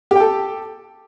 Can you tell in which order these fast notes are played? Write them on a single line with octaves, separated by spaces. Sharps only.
G4 G5 A4